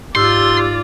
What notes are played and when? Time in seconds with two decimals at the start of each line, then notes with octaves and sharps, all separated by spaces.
0.15 G#2 F4 G4 D5 C6 E6 F6